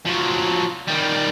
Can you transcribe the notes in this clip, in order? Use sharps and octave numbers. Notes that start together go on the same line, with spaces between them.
F3 F#3
D#3 G3